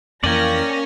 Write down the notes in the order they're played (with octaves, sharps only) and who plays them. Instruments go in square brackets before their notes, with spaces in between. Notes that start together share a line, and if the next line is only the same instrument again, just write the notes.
[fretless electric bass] F2 E3 [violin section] A#3 A#6 [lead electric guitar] C#4 C#5 [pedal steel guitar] D5 G5